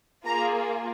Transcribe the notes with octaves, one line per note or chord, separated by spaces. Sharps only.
A#3 F4 G#4 A#5